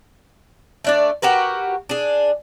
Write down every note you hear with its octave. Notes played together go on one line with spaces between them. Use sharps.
A3 D4 D5
F#4 G4 A#4 B4
D4 G#4